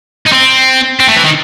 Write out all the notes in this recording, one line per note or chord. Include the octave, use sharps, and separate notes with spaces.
D#4
C4
C4
A3
E3
D#3